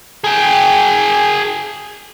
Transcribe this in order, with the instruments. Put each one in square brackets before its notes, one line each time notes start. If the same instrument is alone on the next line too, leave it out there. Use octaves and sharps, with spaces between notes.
[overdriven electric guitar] G#4 G5